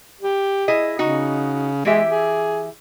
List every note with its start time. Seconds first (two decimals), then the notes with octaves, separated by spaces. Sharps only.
0.21 G4
0.68 E4 G#4 D#5
0.99 C#3 D#4 F#4
1.85 E3 G#3 G4 E5
2.08 G#4